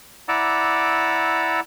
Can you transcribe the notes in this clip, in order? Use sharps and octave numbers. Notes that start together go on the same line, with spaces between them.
E4 D5 F#5 A#5 D6 E6